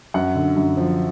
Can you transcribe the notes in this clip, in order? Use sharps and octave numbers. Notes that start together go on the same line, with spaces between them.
F#2 F#5
D3
F#2
F3